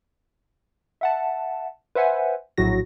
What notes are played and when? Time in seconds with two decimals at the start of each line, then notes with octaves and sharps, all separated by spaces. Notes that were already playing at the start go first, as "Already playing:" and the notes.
1.01 E5 F#5 A5
1.95 B4 C5 E5 F#5 G#5
2.58 A#1 A2 F#3 F#4 A#6